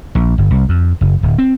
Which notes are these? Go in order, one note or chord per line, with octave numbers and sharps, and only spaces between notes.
A#1
G1
C2
F2
F#1
D1
C4